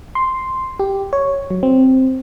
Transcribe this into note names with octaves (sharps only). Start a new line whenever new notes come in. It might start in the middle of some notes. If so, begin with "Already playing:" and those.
C6
G4
C#5
F#3
C4